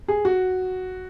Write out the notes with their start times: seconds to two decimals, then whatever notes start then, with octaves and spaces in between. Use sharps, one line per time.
0.08 G#4
0.25 F#4